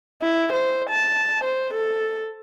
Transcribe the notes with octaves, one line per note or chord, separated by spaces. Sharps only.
E4
C5
A5
C5
A4